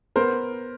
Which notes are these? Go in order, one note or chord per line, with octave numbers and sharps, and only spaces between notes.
B3 A#4 C5